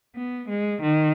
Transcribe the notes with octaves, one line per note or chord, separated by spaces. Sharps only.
B3
G#3
D#3